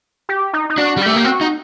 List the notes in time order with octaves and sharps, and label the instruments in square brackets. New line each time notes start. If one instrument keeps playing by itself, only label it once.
[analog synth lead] G4
D#4
D#4
[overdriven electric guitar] D4 [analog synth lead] F#4
[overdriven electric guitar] G3
[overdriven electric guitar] A3 [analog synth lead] G4
[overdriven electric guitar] A#3 [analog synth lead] G4
[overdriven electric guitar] C4 [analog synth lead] F#4
[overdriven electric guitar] D#4